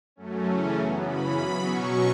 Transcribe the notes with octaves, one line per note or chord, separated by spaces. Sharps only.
F#2 F#3 A3 C#4
C#3 E3 A3 C#4
F#2 F#3 B3
C#3 E3 C#4 B5
F#2 F#3 B3
B2 F#3 C#4 C#6